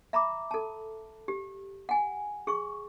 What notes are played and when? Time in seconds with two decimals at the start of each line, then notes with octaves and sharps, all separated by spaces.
0.13 E5 A#5 B5 D6
0.51 A4 A5
1.28 G4
1.89 F#5 G#5
2.47 G#4 C#6